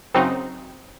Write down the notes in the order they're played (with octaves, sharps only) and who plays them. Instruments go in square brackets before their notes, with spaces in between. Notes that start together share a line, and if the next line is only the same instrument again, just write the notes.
[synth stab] F#2 C#3 F#3 C4 D#4